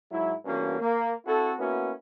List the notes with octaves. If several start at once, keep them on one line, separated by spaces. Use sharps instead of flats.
G#2 F#3 E4
E2 G2 A#3 C#4 F#4
A#3
C4 E4 F#4 A4
A#3 B3 C#4 E4 F#4